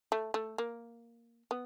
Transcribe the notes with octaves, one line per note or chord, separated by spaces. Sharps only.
A3
A3
A#3
B3